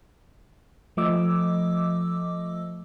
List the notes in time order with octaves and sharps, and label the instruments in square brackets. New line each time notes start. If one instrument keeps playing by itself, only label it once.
[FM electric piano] F3 A3 D#5 D6 E6